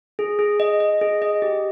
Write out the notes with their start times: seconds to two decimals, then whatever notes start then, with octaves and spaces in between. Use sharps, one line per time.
0.19 G#4
0.39 G#4
0.60 D#5
0.80 D#5
1.01 G#4
1.22 D#5
1.42 G4